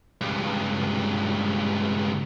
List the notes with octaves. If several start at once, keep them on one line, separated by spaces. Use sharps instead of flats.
C#2 G2